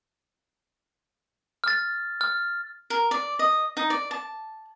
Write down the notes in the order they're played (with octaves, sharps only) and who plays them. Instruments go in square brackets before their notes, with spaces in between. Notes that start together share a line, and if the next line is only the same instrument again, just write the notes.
[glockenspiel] F6 A6
F6
[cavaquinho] A#4
D5
D#5
D#4
D5
A5